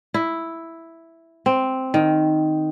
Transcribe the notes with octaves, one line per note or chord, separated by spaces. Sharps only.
E4
C4
D#3